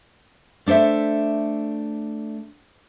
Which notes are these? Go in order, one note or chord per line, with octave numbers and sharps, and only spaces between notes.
A3 D4 A4 C5 E5